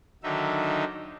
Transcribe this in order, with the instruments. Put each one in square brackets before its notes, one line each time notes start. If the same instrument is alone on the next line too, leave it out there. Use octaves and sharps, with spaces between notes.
[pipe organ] D3 D#3 F#3 D#4 E5